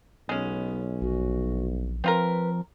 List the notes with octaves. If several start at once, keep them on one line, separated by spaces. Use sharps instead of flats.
B1 G#3 B3 C#4
A#1 F#4
F3 C4 F4 A#4 B4